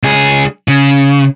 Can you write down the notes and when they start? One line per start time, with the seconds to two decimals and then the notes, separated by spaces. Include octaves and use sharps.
0.03 C#2 G#4
0.68 C#3